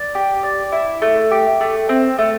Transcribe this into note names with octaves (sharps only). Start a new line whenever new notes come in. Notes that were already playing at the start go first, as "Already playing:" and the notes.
Already playing: D5
G4
D5
E4
A3
G4
A3
C4
A3